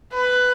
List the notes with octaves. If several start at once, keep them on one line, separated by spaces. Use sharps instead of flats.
B4